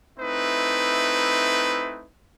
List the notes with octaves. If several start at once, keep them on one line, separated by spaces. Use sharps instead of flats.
A3 C4 D#4 E4 B4